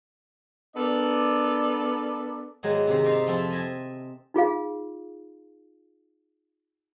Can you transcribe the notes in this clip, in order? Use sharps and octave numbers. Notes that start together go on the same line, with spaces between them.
B3 D4 A4 A#4 D5
G#2 D#3 F#3 G#3 A#3 B3
C3 D#3
D#4 F4 A#4 D5 E5 F5
F2 F3 E4 F4 A4 E5
D#5 E5 G#5 A5
D#4 F4 G#4 F5